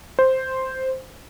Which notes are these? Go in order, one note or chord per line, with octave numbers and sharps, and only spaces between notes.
C5